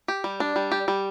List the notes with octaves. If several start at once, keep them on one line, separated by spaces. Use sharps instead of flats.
G4
G3
D4
G3
G4
G3